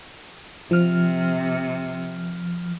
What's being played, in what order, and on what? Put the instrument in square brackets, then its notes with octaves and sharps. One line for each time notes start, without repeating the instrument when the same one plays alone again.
[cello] C3 [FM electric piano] F3 F6